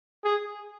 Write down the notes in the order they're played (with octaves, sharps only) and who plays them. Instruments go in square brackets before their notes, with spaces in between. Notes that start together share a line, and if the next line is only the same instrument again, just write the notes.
[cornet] G#4